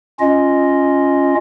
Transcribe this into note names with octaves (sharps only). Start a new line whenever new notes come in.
C#4 F4 D#5